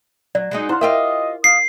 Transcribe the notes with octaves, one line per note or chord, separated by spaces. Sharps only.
F#3 D5
F#3 G#3 D#4
E4 C5 F5 F#5 C6
F4 G4 A#4 D#5 E5
F5 D#6 C7